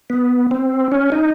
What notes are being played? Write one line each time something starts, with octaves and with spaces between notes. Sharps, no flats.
B3
C4
C#4
D#4